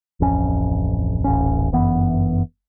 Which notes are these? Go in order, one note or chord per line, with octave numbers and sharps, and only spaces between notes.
D1 A1 F2 C#4
D#1 A1 C#4
G1 F#2 E3 B3